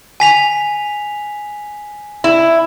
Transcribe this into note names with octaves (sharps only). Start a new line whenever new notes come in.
G#5 B6 F7
E4